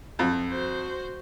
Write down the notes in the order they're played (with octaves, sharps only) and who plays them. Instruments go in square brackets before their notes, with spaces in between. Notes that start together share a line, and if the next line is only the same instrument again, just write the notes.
[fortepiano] F2
[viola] F#4 C5